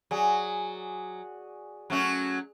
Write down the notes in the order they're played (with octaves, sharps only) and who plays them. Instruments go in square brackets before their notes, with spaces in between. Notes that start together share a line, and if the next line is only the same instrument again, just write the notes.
[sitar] F#3 [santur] G#4 D5 G#5
[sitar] F#3 A3 C#4